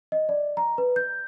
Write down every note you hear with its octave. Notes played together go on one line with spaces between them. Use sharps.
D#5
D5
A#5
B4
G6